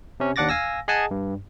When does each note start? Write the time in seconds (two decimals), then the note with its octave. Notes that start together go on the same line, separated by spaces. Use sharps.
0.20 C3 C#4
0.36 D#2 D4 F#5 D6 A6 A#6
0.49 F5 G#5 E6 A#6
0.88 G#4 D#5 F#5 G#5 A5
1.11 G2